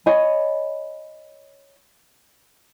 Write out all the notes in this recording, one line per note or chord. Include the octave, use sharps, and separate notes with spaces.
C#5 D#5 G#5 B5